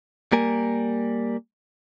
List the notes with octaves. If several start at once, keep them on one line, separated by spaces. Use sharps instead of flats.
G3 A#3 A#4 G#5